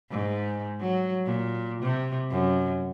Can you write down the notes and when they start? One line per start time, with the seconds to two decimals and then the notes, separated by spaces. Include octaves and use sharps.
0.11 G#2
0.81 F#3
1.26 A#2
1.83 C3
2.31 F#2